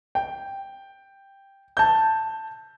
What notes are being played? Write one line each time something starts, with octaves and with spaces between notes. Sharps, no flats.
G5
A5 G6